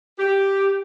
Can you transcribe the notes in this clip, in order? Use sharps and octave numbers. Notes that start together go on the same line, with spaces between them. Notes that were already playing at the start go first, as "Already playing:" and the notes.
G4